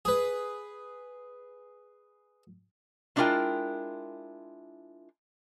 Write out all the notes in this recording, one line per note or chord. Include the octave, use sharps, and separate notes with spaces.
G#4 B4
G#3 D4 E4 F4 A#4 G5